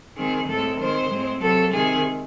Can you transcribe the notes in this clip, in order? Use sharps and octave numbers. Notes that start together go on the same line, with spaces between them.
D#3 G#3 C4 G#4
A2 G#3 C4 A4
D#3 G#3 C4 C5
A2 G#3 C4
C3 F#3 C4 A4
C3 D#3 G#3 C4 G#4